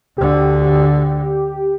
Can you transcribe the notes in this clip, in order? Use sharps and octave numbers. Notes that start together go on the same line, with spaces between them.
D2 D3 G4